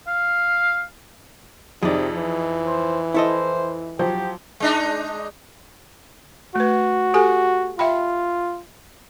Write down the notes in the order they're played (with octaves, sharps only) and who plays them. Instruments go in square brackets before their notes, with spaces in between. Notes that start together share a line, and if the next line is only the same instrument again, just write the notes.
[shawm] F5
[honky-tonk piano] F2 D#4 [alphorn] C3 [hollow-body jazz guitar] G#4 D5
[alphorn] E3
[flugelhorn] C5
[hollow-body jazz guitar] E4 A4 D#5 [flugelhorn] C5
[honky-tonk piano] F3 F#3 C5 [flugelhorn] G4
[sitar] G#3 D4 D#4
[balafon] A3 B4 [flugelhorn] F#4
[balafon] G4 A4 G#5
[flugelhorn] F4 [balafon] E5 G5 B5